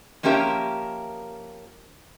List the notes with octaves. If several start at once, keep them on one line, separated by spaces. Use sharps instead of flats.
F3 A#3 C#4 G4 A#4 E5